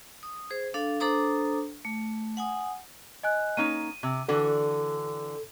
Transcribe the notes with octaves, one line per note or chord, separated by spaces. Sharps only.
D#6
G#4 C5
D4 A4 F5
D4 A4 C5 A#5 D6 D#6
A3
F#5 G#5 D#6
D#5 G#5 F#6
A#3 C#4 D#4 D#7
C3
D3 E3 F#4 A4